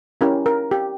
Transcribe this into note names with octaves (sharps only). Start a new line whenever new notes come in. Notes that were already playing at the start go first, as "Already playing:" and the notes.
C#4 E4 G4 A#4
A#4
G4